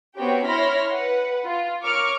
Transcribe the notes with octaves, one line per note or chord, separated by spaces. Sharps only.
B3 C4 F#4 G4 C#5 G5
E4 C#5 B5 C6 F6 A#6
B4 F#5
F4
A#4 C#5 C#6 D6 F6